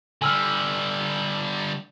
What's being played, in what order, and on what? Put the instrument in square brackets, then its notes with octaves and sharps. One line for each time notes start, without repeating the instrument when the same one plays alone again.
[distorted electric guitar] D3 G3 [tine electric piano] G#5 E6 F6